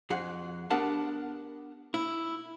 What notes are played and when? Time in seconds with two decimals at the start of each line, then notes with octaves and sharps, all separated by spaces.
0.10 F2 G#4 F#5
0.70 B3 D4 G4 A#4 F#5 A5
1.94 E4